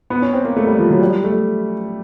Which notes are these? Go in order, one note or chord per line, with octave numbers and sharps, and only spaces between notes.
B3
C#4
C4
A#3
A3
G3
F3
F#3
G3
A3